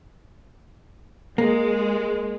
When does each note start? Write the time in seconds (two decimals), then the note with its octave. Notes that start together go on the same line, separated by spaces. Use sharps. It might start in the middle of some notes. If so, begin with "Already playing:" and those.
1.38 G#3 A#3